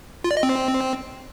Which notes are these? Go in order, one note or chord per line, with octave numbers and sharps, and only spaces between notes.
F4
D5
D#5
C4